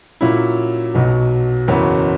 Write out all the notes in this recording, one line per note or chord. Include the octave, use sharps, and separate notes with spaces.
A#2 F#3 C#4 E4
B1 B2 F#3
F#1 E2 C#3 F#3 C#4